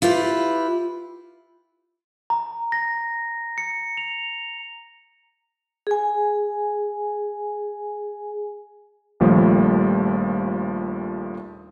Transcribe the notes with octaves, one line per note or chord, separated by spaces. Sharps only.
E4 F4 G4 B4
A#5
A#6
C#7
F7
G#4 G#5
A#1 D#2 F3 G3 A3